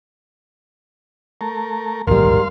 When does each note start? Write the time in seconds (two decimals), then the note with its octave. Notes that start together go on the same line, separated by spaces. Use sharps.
1.41 A3 A#4
2.07 D1 A#1 D#2 G#2 G3 A#4 F5 C6